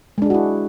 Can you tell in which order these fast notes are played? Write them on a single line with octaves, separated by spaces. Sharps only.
G#3 D4 G#4 F#4 E4